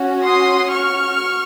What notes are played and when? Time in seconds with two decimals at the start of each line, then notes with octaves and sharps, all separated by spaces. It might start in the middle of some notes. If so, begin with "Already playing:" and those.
Already playing: C#4 F#4
0.24 C6 D#6
0.71 C#6 F6